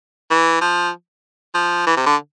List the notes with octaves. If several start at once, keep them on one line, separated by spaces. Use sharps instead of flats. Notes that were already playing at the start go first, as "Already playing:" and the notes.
E3
F3
F3
E3
C3
D3